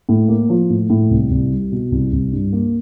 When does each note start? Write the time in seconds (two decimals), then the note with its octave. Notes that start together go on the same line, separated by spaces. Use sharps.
0.09 A2
0.28 A#3
0.49 F3
0.70 A2
0.90 A2
1.10 C2
1.31 C2
1.50 G3
1.72 B2
1.92 C2
2.12 C2
2.32 G2
2.52 A#3